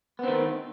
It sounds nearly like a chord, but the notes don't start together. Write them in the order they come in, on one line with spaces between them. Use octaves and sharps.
B3 C4 D#3